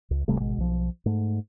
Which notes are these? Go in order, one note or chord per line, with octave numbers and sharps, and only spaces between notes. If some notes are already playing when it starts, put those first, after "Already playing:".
C#2
D1 C3 G3 A3
G#1 B2 G#3
B1 F3
G#2 A3